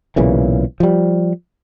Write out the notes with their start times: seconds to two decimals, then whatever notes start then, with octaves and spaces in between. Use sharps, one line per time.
0.16 B1 A#2 C#3 E3
0.80 F3 G3